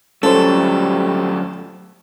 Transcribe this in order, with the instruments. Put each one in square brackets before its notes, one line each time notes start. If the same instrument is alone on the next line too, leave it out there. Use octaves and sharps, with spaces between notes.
[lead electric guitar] F#3 A3 [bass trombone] G3 [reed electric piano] C#4 F4 C5 [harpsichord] A4